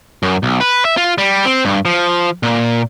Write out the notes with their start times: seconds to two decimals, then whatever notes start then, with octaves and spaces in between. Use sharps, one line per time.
0.23 F#2
0.43 B1
0.61 B4
0.85 E5
0.97 F4
1.18 G3
1.45 C4
1.65 G2
1.85 F3
2.43 A#2